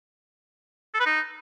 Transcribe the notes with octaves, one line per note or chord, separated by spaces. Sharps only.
A4
B4
D#4